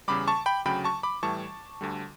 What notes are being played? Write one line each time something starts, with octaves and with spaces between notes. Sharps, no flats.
E2 C#3 G3 B5 D6
A5 C#6
G5 B5
D2 C#3 F#3 G5 B5
A5 C#6
B5 D6
A2 E3 G3 A5 C#6
D2 D3 G3